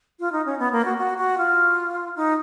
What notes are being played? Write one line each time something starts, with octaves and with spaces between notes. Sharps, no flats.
F4
D#4
C#4
B3
A#3
F#4
F#4
F#4
F4
D#4